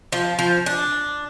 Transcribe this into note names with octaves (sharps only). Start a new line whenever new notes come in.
F3
F3
D4